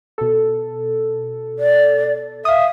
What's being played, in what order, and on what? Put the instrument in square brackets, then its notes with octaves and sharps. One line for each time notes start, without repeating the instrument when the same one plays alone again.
[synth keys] B2 A4
[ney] D5
[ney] E5 [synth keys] F5 D#6